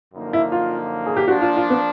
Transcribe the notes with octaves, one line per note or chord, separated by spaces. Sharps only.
F#2 D3 F3 A#3 D#4
E4
F4
G#4
G4
F3 A#3 D4 F#4
F4
F4
B3